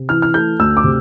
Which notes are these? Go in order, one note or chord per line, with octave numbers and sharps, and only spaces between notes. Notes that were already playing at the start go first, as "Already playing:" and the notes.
Already playing: C3
E3 F6
F6
A3 G6
D2 E6
D6
C3